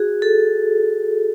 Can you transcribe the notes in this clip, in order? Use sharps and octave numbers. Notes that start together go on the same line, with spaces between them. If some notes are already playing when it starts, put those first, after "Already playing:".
Already playing: F#4 G#4
A4